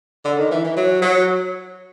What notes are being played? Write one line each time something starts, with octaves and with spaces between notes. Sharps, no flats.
D3
D#3
E3
E3
F#3
F#3